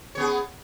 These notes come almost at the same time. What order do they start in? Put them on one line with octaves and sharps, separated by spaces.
C#5 B3 G#4